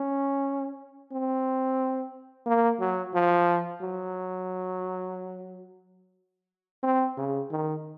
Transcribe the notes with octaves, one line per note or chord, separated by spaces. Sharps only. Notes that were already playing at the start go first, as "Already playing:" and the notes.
Already playing: C#4
C4
A#3
F#3
F3
F#3
C4
C#3
D#3